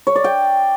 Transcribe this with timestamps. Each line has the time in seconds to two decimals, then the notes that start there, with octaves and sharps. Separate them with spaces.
0.07 C#5
0.16 D5
0.24 G5